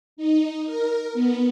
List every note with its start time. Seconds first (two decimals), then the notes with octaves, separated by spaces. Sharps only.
0.17 D#4
0.65 A#4
1.13 B3